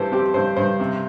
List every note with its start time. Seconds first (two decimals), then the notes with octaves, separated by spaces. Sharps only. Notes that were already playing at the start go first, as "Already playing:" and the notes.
Already playing: G2 E3 G4 A4 C5
0.12 C4 G4
0.34 G2 C5
0.57 G2 C5
0.80 C3